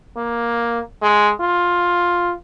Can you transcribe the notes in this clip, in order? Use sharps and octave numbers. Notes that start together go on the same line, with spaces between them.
A#3
G#3
F4